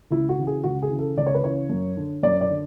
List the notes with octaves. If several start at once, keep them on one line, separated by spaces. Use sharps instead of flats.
C#2 E4
F#4
C#3 E3
G#4
C#2 F#4
G#4
C#3 E3
A4
C#2 D5
C#5
B4
C#3 E3 C#5
F#2
D3
F#2 D5
D5
D3